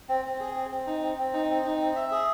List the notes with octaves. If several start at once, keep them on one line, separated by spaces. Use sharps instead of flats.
C4
C4
G#4
C4
C4
D#4
C4
C4
D#4
C4
D#4
C4
E5
G#4